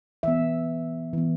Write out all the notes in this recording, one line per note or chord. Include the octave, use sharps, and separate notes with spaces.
E3 B3 E5
E3 B3